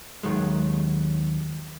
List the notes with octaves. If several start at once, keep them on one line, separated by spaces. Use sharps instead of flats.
D#2 D#3 F#3 G#3